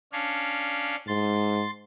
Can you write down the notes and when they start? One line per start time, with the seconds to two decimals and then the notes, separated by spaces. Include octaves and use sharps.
0.12 C#4 D4 F5
1.07 G#2 C6 A6